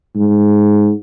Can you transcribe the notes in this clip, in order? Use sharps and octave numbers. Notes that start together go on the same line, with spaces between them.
G#2